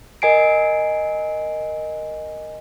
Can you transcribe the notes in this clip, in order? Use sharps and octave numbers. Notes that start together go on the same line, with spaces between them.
A#4 D#5 G#5 C7 D7